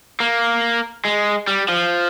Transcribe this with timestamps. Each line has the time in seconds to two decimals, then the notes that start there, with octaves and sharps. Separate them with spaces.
0.20 A#3
1.05 G#3
1.47 G3
1.69 F3